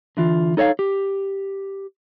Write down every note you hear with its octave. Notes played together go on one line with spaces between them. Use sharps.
D3 E3 F4
D#4 A4 C#5 D#5 F5
G4